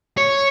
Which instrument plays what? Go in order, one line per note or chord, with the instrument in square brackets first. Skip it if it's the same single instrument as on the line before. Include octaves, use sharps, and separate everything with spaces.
[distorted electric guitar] C#5